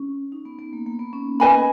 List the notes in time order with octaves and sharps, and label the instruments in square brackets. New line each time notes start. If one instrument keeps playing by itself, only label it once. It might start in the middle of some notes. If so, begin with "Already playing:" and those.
Already playing: [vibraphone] C#4
D#4
B3
B3
A#3
A#3
B3
C#4
[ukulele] B4 D#5 G#5 B5